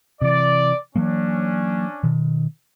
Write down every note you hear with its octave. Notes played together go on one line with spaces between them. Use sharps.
C3 E3 D5
E3 F#3 A#3 C#4 D4
B2 D#3